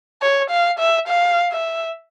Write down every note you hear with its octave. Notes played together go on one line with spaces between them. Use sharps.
C#5
F5
E5
F5
E5